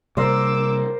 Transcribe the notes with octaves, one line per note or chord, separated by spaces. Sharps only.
C3 G3 A#3 A#4 C5 D5 D6 E6